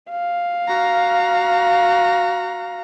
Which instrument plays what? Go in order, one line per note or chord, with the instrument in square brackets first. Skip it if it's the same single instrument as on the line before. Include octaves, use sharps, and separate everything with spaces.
[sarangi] F5
[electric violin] F#4 A#5